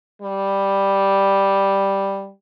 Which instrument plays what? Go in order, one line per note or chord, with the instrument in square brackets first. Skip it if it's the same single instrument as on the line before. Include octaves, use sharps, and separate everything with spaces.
[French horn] G3